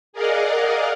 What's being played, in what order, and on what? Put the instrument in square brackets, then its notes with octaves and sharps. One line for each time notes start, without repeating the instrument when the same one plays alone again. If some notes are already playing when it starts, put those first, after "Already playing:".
[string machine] G#4 A#4 D5 D#5 F5 F#5